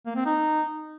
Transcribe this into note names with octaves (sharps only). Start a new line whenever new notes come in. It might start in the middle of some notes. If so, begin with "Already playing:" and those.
A#3
C4
D#4